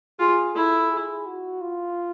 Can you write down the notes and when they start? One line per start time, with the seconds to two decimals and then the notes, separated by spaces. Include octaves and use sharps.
0.19 F4 G#4
0.55 E4 A4
0.90 G#4
1.26 F#4
1.62 F4